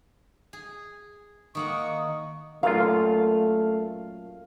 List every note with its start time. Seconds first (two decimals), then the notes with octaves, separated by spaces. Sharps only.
0.53 G#4
1.55 D#3 A#3 F#5 C#6 D#6
2.63 F#2 A#2 A3 F4 F5